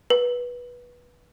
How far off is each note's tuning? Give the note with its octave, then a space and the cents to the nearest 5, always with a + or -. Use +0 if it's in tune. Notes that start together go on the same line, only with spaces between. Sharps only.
B4 -15